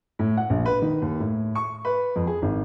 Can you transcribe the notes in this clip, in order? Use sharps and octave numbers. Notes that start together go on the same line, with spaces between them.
A2
F#5
A#1
B4
D#3
D#2
A2
C#6
B4
F2
G#4
G#1